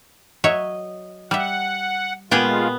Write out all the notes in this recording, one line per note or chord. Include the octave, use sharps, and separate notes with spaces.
F#3 C#5 D#5 E5
G3 E5 F#5
A#2 G#3 B3 F4 G4 G#4